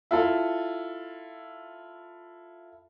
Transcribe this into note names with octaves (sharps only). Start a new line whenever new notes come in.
E4 F4 A4